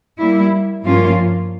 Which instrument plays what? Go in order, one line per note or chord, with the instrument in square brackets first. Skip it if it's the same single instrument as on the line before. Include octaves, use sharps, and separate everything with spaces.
[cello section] G3 A#3 E4
G2 F3 A#3 C#4 F4